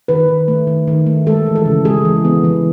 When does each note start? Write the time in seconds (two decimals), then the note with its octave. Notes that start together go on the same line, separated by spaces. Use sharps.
0.08 D#3 B4
0.28 D#3
0.48 A3
0.67 D#3
0.87 D#3
1.06 A3
1.27 G#3 A4
1.46 E3
1.55 A4
1.66 C#3
1.85 G#3 G#4
2.05 E3
2.25 B3
2.44 E3